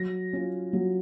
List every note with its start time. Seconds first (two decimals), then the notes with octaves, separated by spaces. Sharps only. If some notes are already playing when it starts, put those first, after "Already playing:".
Already playing: F#3 A#6
0.33 C#4 F4
0.73 F#3